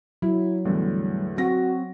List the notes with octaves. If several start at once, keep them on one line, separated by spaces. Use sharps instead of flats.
F#3 E4
E2 A2 D3 G3
C4 F#4 A#6